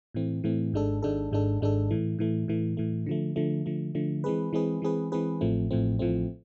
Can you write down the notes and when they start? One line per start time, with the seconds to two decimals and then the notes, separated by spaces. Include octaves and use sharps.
0.14 A2 E3 A3 C4
0.44 A2 E3 A3 C4
0.73 G#1 G#2 G#3 D4 A4
1.02 G#1 G#2 G#3 D4 A4
1.32 G#1 G#2 G#3 D4 A4
1.61 G#1 G#2 G#3 D4 A4
1.91 A2 E3 A3
2.19 A2 E3 A3
2.48 A2 E3 A3
2.77 A2 E3 A3
3.06 D3 F3 A3
3.36 D3 F3 A3
3.66 D3 F3 A3
3.95 D3 F3 A3
4.24 E3 G#3 C4 G#4 B4
4.53 E3 G#3 C4 G#4 B4
4.82 E3 G#3 C4 G#4 B4
5.12 E3 G#3 C4 G#4 B4
5.41 A1 A2 F3 A3 C4
5.71 A1 A2 F3 A3 C4
5.99 A1 A2 F3 A3 C4